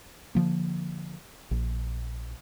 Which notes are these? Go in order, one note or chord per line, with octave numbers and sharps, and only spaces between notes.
D3 F3 A#3
A#1